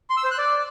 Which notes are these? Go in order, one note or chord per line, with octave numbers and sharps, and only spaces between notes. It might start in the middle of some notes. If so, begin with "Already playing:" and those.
C6
E6
C5
F#6
D5